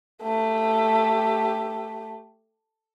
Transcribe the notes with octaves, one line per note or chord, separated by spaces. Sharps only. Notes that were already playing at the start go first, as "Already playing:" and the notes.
A3 G4